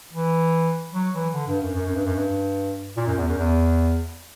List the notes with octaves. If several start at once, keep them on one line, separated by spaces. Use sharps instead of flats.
E3
F#3
E3
D3
G2
F#2
F#2
F#2
G2
F#2
G2
A#2
F#2
E2
F#2
E2